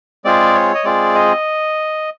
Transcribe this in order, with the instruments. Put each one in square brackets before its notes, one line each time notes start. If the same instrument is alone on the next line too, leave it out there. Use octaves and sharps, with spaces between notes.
[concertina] G#3 C4 F4 G#4 D5
C#5
D#5
G#3 C4 F4 G#4 D5
D#5